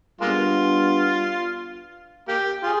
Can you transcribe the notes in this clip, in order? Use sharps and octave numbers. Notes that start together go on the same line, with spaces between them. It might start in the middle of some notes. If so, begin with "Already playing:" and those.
G3 G#3 A#3 B3 D4 F4
A#3 G4
F4 G#4